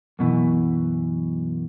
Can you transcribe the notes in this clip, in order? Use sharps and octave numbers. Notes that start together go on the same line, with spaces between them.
F#2 B2 D3 E3